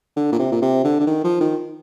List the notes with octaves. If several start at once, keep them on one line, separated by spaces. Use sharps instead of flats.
D3
A#2
C3
A#2
C3
D3
D3
D#3
F3
D#3